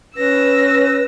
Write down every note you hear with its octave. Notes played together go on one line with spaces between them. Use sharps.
C#4 B4 E6 A#6